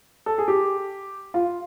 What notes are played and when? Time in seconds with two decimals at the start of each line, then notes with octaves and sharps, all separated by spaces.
0.26 A4
0.38 G#4
0.48 G4
1.34 F4